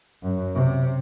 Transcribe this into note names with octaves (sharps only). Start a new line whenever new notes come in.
F#2
C3